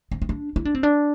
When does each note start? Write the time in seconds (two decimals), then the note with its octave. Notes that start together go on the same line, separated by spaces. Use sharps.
0.11 C4
0.22 C4
0.29 D4
0.56 E4
0.65 D4
0.75 C4
0.83 D4